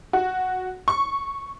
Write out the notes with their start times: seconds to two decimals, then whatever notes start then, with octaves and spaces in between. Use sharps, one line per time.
0.13 F#4
0.88 C#6